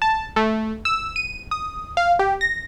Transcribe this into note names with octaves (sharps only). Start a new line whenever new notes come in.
A5
A3
E6
D#7
D#6
F5
G4
A#6